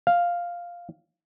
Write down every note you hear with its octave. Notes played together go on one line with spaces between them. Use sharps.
F5